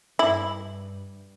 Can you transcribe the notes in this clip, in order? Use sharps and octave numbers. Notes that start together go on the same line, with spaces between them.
G2 E4